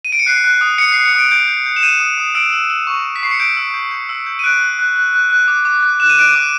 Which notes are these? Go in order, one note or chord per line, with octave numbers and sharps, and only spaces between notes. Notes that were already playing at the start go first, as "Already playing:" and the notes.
D#7
D7
C#7
F#6 C7
F#6
D#6
D#6 C#7
D#6 C7
C#7
D#6
D7
G6 D7
G6
G6
E7
G6 D#7
D#6
D#6
E6 D7
E6
E6
C#6
C#6
B6
C#6 C7
C#7
G6 D7
E6
G6
G6
E6
G6
D#7
F#6 D7
F#6
F#6
F#6
F#6
F#6
D6
D6
F#6
F#6 E7
D#7
F#6 D7
D#7
D6